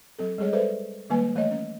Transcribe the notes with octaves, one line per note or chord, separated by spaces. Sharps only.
F#3 C4 A4
G3 G#3 G#4 C#5 D#5
A4 B4 C5 D5 E5
D#3 G3 G#3 A#3 B4 G#5
E3 A3 C#5 D#5
C#4